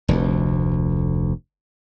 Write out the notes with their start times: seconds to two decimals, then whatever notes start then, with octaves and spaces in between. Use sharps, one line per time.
0.08 F1 D2